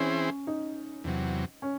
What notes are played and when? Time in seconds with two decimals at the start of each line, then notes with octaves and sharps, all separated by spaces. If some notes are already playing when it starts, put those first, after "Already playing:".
Already playing: E3 C4 C#4 E4 G#4 C5
0.47 D#4
1.04 E2 C3 F#3
1.62 C#4